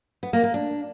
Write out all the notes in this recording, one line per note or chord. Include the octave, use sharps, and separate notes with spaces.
B3
A#3
A#3
D4